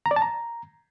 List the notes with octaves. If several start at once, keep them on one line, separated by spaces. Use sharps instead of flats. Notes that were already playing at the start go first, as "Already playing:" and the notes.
A#5
D5
A5
A#5